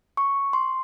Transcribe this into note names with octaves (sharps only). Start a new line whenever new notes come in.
C#6
C6